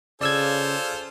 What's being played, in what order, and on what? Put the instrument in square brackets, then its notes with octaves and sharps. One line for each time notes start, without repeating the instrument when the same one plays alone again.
[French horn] C#3 [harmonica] F4 A4 C5 [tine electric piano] D5 E6 G#6